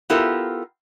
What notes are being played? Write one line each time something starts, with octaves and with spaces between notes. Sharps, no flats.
B3 E4 F4 G4 A4 A#4